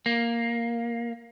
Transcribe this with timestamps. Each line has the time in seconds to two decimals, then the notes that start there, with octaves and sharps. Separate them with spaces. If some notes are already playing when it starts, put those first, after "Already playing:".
0.06 A#3